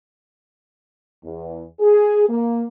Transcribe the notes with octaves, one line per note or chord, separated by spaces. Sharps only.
E2
G#4
A#3